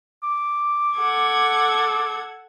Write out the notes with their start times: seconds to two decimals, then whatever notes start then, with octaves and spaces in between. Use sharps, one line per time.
0.23 D6
0.98 A4 F#5 G#6